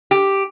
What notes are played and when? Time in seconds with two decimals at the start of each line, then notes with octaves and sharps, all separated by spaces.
0.11 G4